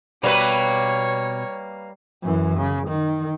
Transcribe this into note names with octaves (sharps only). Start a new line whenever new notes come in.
B2 G3 A#3 B4 C#5
F#2 E3
C#3
D#3